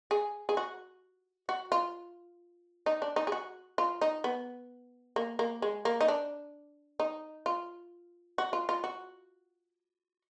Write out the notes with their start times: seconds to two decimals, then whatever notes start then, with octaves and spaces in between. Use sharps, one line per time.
0.11 G#4
0.49 G#4
0.57 F#4
1.49 F#4
1.72 F4
2.86 D#4
3.02 D4
3.16 D#4
3.27 G#4
3.32 F#4
3.78 F4
4.01 D#4
4.24 B3
5.16 A#3
5.39 A#3
5.62 G#3
5.85 A#3
6.01 D#4
6.08 D4
7.00 D#4
7.46 F4
8.38 F#4
8.53 F4
8.69 F4
8.84 F#4